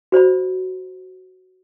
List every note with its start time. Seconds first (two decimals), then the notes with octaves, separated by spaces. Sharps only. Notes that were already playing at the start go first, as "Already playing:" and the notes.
0.12 F#4 C5 D5 B5